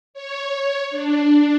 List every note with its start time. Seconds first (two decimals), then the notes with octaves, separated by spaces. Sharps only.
0.14 C#5
0.90 D4